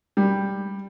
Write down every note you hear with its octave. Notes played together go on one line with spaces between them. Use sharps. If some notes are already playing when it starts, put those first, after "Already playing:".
G3